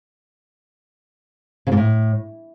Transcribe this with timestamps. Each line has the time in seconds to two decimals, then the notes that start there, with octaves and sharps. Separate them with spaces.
1.67 C#3
1.72 A#2
1.77 A2